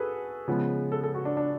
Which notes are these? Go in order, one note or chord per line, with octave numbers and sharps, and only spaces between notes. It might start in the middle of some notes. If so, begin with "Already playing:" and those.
Already playing: F#4 G#4 A4 B4
C#3 F3 G#3 B3
A4
A4
F#4
D4
D4